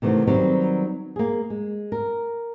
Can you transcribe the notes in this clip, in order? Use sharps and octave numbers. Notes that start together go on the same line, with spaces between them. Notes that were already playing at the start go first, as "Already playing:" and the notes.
C3 D#3 E3 A3 B3 C4
D#3 F#3 G3 B3 C4
A#3 G#4
G#3
A#4